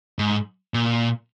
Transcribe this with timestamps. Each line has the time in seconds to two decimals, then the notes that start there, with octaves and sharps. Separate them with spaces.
0.19 G#2
0.74 A#2